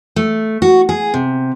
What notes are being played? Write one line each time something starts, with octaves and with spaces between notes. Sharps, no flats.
A3
F#4
G#4
C3